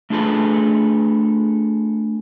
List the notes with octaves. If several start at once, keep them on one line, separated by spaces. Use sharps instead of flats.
A3 D4 F4 G#4 A4 B4